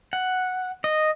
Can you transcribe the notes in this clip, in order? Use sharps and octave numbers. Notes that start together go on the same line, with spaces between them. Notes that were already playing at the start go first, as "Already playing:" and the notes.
F#5
D#5